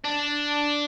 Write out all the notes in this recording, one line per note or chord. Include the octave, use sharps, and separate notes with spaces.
D4